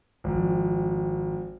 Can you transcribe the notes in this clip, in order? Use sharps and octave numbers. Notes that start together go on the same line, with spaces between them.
G#1 F2